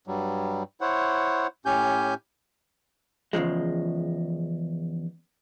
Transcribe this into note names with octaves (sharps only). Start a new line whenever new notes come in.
G2 F#3 G3
E4 C5 C#5 F#5
A2 C#4 G4 G#5 G6
E2 G2 C#3 F3 G#3